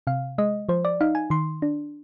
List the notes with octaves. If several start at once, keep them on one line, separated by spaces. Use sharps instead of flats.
C3 F5
G#3 D#5
F3 C5
D5
D#4 F5
G#5
D#3 C6
D4